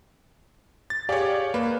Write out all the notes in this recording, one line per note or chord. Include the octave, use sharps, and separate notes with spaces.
A6
G4 G#4 C#5 D5 F5
A#3 B4